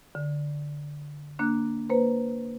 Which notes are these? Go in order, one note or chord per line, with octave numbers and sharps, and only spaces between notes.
D3
A#3 D4 F#6
A#3 B4 C5